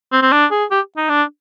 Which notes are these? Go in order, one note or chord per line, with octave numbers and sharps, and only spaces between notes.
C4
C4
D4
G#4
G4
D#4
D4